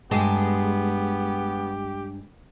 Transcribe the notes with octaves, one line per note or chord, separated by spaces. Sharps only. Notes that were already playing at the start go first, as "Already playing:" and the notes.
G2 G#3 B3 G4 A5